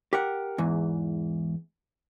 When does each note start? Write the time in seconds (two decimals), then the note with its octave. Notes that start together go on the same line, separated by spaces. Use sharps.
0.13 G4 A#4 F#5
0.58 E2 G#2 E3